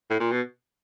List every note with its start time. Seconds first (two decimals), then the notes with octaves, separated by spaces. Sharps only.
0.10 A2
0.20 A#2
0.31 B2